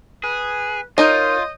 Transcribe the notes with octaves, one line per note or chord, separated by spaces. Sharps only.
G#4 B4
D#4 F4 A#4 C#5 D#5 G6